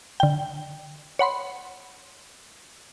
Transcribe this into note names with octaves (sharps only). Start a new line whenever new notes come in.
D3 G5
C#5 F#5 B5 C6